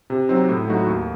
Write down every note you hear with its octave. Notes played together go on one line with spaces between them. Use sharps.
C3
F#3 C4 D#4
A2
F#3 A3 D#4 F#4
D#2